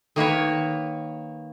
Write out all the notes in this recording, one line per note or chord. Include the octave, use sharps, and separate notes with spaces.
D#3 A#3 B4 C#5